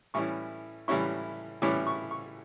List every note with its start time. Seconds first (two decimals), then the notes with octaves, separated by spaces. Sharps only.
0.14 A2 E3 G3 C#4 E4 C#6
0.88 A2 E3 G3 C#4 E4 C#6
1.62 A2 E3 G3 C#4 E4 D6
1.87 C#6
2.11 C#6